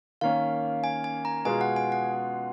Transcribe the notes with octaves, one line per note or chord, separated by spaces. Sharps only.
D#3 A#3 C#4 F5
G#5
G#5
A#5
B2 G#3 B3 F4 G#4 G#5
F#5
G#5
F#5